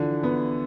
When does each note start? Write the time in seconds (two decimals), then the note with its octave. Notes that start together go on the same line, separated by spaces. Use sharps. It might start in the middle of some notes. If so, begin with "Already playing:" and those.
Already playing: D3 E3 F3
0.23 B3